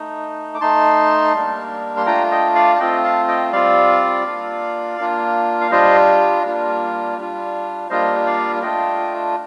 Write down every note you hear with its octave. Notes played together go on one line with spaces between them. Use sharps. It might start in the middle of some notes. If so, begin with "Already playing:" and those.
Already playing: A3 D#4
D6
A3 D#4 A5 C6
G3 A#3 D4
C6
A3 D4 F4 G5 A#5
D#5 G5
D5 F5
A5
A3 C4 F4 D#5 G5
F5 A5
D#5 G5
G3 C4 F4 D5 F5
A#3 D4 F4
A#3 D4 F4
F5
G3 D4 F4 C5 D#5
G3 A#3 D4 F4
G3 D4 F4
G3 A#3 D4 F4 C5 D#5
D5 F5
A3 D4 F4 D#5 G5